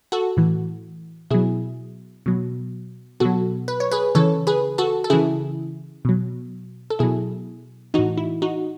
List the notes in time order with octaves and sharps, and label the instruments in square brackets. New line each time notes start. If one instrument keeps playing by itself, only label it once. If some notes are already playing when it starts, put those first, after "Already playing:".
[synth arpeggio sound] F#4 A4
A2 E3
B2 F#3 E4 G#4
B2 F#3
B2 F#3 F#4 A4
B4
C#5
G#4 B4
C#3 E3 A4 C#5
G#4 B4
F#4 A4
A4
C#3 E3 E4 G#4
B2 F#3
A4
B2 F#3 E4 G#4
A2 E3 D#4 F#4
E4
D#4 F#4